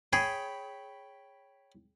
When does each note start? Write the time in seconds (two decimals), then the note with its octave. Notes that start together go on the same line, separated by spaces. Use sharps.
0.13 G#4 C#5 G5 B5